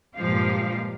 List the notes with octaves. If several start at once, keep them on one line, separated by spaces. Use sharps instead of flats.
G2 A#2 F3 G#3 G4 F5